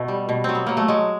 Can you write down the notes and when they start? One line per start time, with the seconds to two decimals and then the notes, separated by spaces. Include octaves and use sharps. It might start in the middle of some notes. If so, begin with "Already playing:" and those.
Already playing: B2 A3
0.08 G3
0.29 B2
0.44 F#3 C4
0.55 B3
0.67 F#3 A#3
0.77 A3
0.88 F#3 G#3